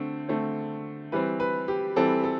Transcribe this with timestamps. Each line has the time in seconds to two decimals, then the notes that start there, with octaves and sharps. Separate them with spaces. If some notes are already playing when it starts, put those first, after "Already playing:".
Already playing: D3 A3 C4
0.29 D3 A3 C4
1.12 E3 G3 C4 B4
1.40 B4
1.68 G4
1.96 E3 G3 C4 A4
2.24 A4